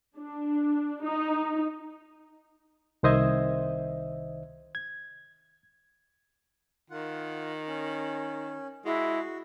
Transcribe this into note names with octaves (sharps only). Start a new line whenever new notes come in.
D4
D#4
C2 D#3 C5 D#5 E5 G#6
G#6
D#3 F4 F#5
C#4
G#3 E4 F#4